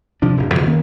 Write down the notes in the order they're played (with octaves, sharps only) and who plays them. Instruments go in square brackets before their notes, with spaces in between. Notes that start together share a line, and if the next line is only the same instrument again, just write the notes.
[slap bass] C3 F3 D4
D1 G1
C2 F2 C#3
D#3 A#3 B3 C#4